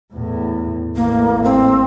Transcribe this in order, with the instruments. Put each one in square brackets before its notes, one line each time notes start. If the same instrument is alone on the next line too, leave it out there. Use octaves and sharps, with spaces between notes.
[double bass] E2 A2
[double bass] A1 [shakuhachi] A#3
[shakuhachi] C4